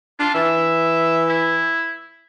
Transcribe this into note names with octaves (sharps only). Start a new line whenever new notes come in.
D4 F4
E3 E5
E4